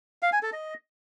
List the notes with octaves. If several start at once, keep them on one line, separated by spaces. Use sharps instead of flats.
F5
G#5
A4
D#5